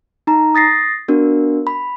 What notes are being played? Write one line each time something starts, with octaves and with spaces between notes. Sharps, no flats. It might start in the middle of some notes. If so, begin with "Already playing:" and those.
D#4 A#5
D#6 A6 A#6 C7
B3 D4 F#4 A#4
B5